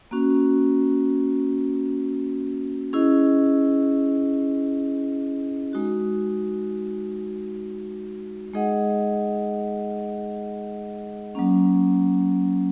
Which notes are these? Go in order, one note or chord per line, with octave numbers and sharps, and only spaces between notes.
A#3 C#4 F#4
C#4 E4 G#4 D#5
G#3 D#4 F#4
G#3 D#4 G#4 D#5 F#5
F#3 A#3 C#4